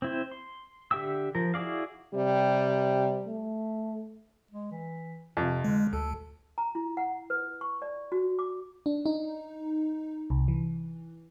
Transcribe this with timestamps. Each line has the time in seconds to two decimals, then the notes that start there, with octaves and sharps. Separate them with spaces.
0.02 C4 E4 C5
0.31 C6
0.91 D3 G4 E5 G5 E6
1.35 F3 A#4
1.54 E4 F#4 G#4 D5 F5
2.14 C3 G3
3.26 A3
4.51 G#3
4.71 E3
5.37 F2 C3
5.64 D3 G#3
5.93 D2 A4
6.58 A#5
6.75 E4
6.97 F#5
7.30 B4
7.61 C#6
7.82 D5
8.12 F#4
8.39 D6
8.86 D4
9.06 D#4
10.30 C2
10.48 E3